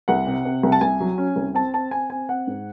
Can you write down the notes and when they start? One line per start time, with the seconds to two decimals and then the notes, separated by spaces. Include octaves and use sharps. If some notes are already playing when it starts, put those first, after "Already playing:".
0.08 C2 F#5
0.27 C3
0.45 C3
0.63 C2
0.72 A5
0.81 C2 G#5
1.00 F#3
1.18 C#4
1.36 C2
1.54 C4 A5
1.74 C4 A5
1.91 C4 G#5
2.10 C4 G#5
2.29 C4 F#5
2.47 G#2